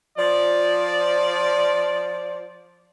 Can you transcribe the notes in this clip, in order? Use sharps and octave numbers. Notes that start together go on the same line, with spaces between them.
F3 D5